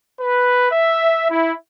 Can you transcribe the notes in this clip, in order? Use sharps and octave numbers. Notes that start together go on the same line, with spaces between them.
B4
E5
E4